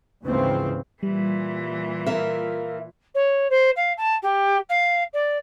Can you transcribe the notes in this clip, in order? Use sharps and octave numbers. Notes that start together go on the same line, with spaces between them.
D2 G#2 C#3 E3 F3 C4
A#2 E3 G3
F4 A#4 E5
C#5
C5
F5
A5
G4
F5
D5